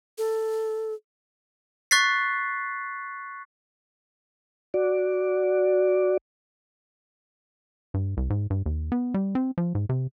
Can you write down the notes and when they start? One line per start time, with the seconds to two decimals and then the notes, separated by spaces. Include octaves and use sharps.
0.18 A4
1.91 C#6 F#6 A6 B6 C7
4.74 F#4 D5
7.94 G2
8.17 C2
8.30 G#2
8.50 G2
8.66 D#2
8.92 B3
9.14 G3
9.35 C4
9.58 F3
9.75 G#2
9.89 C3